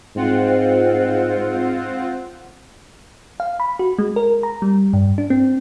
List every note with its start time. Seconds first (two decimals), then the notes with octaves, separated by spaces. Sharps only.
0.16 G#2 C4 F4 F#5
3.40 F5
3.60 B5
3.79 F#4
3.99 G#3
4.16 A#4
4.43 A#5
4.62 G3
4.93 G2
5.18 D4
5.30 C4